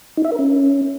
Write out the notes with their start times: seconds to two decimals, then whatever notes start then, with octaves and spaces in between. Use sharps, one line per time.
0.17 D#4
0.25 E5
0.32 A#4
0.39 C#4